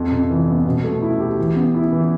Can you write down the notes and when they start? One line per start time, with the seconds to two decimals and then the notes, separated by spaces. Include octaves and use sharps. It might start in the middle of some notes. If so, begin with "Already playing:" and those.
Already playing: F2
0.11 C3
0.30 E3
0.48 B3
0.66 B2
0.84 A3
1.02 E4
1.20 G4
1.39 E3
1.56 B3
1.75 E4
1.92 E3